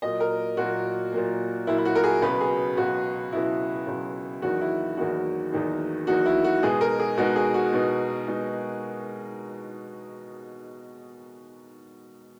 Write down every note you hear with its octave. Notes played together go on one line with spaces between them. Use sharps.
A#2 F#3 A#3 D#5
A#4
A#2 F#3 A#3 F#4
A#2 F#3 A#3
A#2 F#3 A#3 E4
E4
F#4
A#4
G#4
C#2 B2 F#3 B4
G#4
C#2 B2 F#3 F#4
C#2 B2 F#3 E4
C#2 B2 F#3
E2 D#3 F#3 A#3 D#4 F#4
E4
E2 D#3 F#3 A#3 D#4 F#4
E2 D#3 F#3 A#3 D#4
E2 D#3 F#3 A#3 D#4 F#4
E4
F#4
B2 G#3 D#4 G#4
A#4
G#4
B2 G#3 D#4 F#4
G#4
F#4
B2 G#3 D#4
B2 G#3 D#4